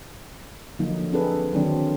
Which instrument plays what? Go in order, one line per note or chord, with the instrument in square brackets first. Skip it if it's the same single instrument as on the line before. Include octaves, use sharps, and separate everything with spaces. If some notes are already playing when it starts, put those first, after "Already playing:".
[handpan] D3 F3 F#3 A#3 D#4
C4 D4 D#4 G#4 A4 B4
D3 D#3 F#3 A#3 C4 D4